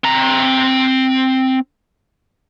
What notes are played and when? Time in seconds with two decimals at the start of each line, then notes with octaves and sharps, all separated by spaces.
0.04 C4 A#5